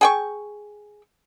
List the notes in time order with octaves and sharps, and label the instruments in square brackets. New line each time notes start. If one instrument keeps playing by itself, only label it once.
[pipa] G#4 G5 C#6